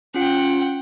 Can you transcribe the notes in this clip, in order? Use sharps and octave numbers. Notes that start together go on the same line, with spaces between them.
C#4 F4 F#5 G5